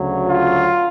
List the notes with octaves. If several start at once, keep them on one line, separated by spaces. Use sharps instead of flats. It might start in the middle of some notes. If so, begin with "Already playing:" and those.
Already playing: D2 C#3 F#3
F4